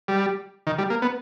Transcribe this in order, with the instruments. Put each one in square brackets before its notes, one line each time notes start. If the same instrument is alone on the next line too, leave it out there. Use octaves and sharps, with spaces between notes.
[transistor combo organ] G3
D#3
G3
A#3
B3